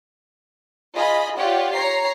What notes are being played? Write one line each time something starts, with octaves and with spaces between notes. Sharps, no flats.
F4 G#4 D#5 B5
F4 G4 C#5 D5 F#5
C#5 A#5 C7